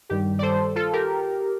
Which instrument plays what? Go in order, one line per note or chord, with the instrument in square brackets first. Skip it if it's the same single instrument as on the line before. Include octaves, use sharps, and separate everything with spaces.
[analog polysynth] G2 D#3 G3 G4
D5
A4 C5
F4 A4
G4 A#4